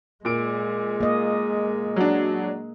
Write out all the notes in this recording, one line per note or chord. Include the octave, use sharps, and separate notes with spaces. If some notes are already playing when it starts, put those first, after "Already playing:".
A#2 G#3 D7
A#3 D#5
F#3 D4